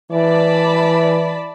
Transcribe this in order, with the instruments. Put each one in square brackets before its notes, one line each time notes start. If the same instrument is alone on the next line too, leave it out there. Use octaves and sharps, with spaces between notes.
[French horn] E3 [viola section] D5 A5 B5